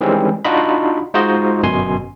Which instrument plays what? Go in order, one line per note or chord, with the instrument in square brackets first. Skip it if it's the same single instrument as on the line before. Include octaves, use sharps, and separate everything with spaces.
[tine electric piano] D#3 E3 G3 G#3 C4 C#4
D4 D#4 F4 F#4 D#5 B5
G#3 D#4 F4 F#4 C5 D#5
G1 F#2 B2 G#5 C6